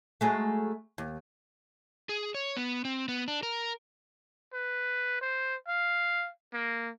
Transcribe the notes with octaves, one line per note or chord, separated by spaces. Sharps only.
F#3 G#3 A3
D#2
G#4
C#5
B3
C4
B3
D4
A#4
B4
C5
F5
A#3